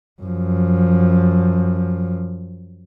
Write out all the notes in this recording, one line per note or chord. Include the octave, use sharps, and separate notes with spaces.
F#2 F3